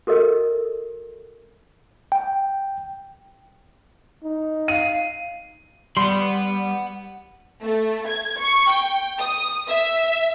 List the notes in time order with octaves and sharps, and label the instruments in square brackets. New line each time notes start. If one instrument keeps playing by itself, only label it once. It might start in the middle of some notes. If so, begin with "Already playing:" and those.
[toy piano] F#4 A4 A#4 D#5
[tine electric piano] G5
[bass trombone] D#4
[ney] F5 [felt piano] D#7
[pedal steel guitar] G3 [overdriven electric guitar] F#5 B5 [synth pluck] C6
[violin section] A3
G#6
C#6
G5
D#6
E5